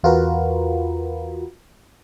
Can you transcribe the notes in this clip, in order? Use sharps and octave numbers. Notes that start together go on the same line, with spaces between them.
E2 F4 F#4 A#4 B4